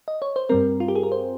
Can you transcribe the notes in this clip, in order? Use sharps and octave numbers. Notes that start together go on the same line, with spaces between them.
D#5
C#5
C5
G2 G3 C4 A#4
F4
G4
G#4
A#4
C5